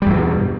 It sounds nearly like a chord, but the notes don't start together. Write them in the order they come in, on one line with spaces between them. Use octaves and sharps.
G3 E2 G2 B2